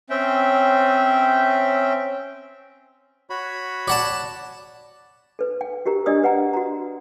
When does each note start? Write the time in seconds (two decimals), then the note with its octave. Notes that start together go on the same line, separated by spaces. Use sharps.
0.10 C4 C#4 E5 G5
3.30 F#4 C#5 B5
3.88 D5 F#5 A5
5.39 A4 B4
5.61 G5
5.86 F#4 G4 A#4 A#5
6.06 D4 G4 D5 D#5 D#6 E6
6.24 B4 F#5 G5 A#5
6.53 F#4 A#5